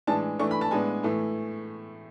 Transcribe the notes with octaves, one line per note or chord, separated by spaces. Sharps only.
A2 E3 G#3 D4 A5
E3 A3 D4 C#6
B5
A5
A2 G#3 B3 D4 G#5
A2 E3 A3